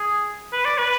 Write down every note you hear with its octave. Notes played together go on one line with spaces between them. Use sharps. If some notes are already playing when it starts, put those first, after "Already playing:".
Already playing: G#4
B4
D5
B4